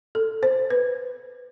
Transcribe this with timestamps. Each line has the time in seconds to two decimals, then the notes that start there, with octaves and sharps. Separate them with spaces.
0.15 A4
0.43 C5
0.70 B4